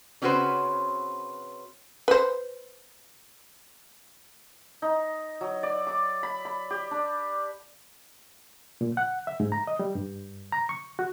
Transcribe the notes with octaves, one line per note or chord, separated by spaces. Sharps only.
C#3 C4 C#4 F#4 B4 C5
B4 C5
D#4
F#3
D5
D6
B5
B5
G4
D4
A#2
F#5
E5
G#2
A#5
D#5
G3
G2
A#5
C#6
F#4